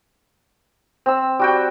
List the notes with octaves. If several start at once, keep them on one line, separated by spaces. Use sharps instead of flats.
C4 E6
G3 F#4 G5